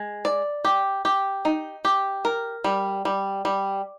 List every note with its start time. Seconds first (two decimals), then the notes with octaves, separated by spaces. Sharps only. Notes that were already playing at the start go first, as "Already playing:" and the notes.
Already playing: G#3
0.25 D5
0.65 G4
1.05 G4
1.45 D#4
1.85 G4
2.25 A#4
2.64 G3
3.05 G3
3.45 G3